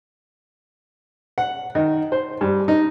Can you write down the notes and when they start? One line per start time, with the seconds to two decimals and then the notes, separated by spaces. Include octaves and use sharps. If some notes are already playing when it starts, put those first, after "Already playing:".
1.38 F#5
1.75 D#3
2.12 C5
2.41 G2
2.68 D#4